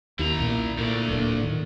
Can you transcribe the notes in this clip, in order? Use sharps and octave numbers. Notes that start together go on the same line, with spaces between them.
D#2 E4 A#5
B1 A#2
D2 A#2 D3
D1 A#2
A2 D#3